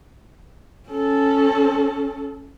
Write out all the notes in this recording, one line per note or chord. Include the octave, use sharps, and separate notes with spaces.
C#4 A4